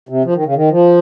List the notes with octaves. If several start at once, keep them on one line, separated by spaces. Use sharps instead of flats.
C3
F3
D#3
C#3
D#3
F3